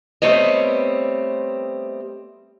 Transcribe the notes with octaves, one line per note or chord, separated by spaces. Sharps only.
G3 A3 B3 C4 C#5 D#5